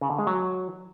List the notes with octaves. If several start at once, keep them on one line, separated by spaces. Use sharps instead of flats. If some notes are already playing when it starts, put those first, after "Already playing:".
C#3
D3
G#3
F#3